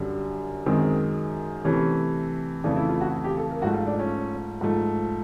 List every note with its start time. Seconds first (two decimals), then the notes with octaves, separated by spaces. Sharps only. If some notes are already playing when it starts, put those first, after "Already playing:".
Already playing: F#2 D3 G3
0.66 F#2 D#3 G#3 C4
1.64 C3 E3 A3 C#4
2.64 F2 C#3 E3 A3 D4
2.76 E4
2.89 F4
3.01 F#4
3.24 G4
3.37 A4
3.50 A#4
3.62 G#2 F3 A3 F#4
3.74 F4
3.87 D4
3.99 C#4
4.61 G#2 F3 A3